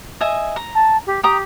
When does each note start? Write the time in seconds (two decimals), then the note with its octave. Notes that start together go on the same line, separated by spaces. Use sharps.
0.21 D#5 E5 G#5
0.56 A#5
0.75 A5
1.07 G4
1.23 G4 G5 A#5 D#6